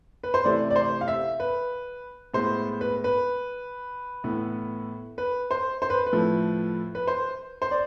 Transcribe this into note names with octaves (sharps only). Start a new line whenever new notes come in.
B4
C5
C3 E3 A3 D5
D5
C5
F5
E5
B4
A2 G#3 B3 C5
B4
B4
A2 E3 B3
B4
C5
C5
B4
B4
A2 F3 A3
B4
C5
C5
D5